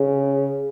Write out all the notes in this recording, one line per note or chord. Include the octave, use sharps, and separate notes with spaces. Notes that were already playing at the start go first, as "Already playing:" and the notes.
Already playing: C#3